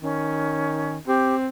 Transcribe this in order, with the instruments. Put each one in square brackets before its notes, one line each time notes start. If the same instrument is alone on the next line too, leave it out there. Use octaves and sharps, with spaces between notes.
[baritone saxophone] D#3 [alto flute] C#4
[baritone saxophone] C4 [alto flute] G4